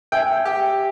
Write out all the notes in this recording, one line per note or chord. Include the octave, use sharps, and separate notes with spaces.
E5 G5 G#5
G4